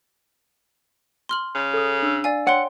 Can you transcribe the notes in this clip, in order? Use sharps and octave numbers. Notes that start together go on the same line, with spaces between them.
C6 F6 F#7
C#3
A4 D#6
D4 E6
D5 F5 G#5
C#5 F#5 G5 C6